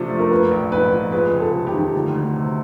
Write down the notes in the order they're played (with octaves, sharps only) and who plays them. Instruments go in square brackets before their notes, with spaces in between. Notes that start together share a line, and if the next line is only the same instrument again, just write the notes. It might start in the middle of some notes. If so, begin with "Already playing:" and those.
Already playing: [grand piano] C3 F3 A3 D4
A3
[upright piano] A#4
[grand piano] A#3 [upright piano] B4
[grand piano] A#1
[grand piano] G#2 [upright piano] B4
[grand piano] F3
[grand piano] G#3 [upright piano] B4
[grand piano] C#2
[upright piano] A4
[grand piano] C3
[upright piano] G4
[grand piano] D#3
D2
D2
C3